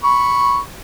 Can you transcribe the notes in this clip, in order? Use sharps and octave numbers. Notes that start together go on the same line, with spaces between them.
B5 C#6